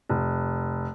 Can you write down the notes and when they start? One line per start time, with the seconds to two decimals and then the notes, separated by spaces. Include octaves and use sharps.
0.09 F1